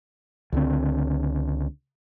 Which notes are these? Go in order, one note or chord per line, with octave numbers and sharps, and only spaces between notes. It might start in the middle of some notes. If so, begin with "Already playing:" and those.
C#2 D3 C4